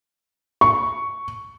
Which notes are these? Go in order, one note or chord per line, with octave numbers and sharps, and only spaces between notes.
C#6